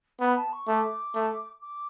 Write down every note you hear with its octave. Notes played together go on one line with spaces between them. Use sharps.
B3 B5
A5
C#6
A3 D6
A3
D6